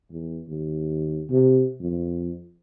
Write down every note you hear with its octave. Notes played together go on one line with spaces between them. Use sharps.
E2
D#2
C3
F2